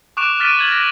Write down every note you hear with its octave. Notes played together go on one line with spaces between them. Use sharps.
C#6 D6 F#6 D7 E7 F7
F6 A6 B6 D7 D#7 G7
G#6 F#7 G7
A#6